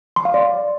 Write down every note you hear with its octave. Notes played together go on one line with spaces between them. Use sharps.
C6
F5
D5